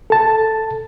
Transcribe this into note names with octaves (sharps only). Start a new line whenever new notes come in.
A4 A5